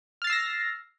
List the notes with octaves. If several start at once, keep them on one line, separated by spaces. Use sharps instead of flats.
E6 F6 A6 A#6 C7